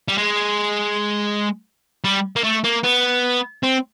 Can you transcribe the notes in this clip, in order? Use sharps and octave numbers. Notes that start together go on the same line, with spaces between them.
G3
G#3
G3
A#3
A3
A#3
B3
C4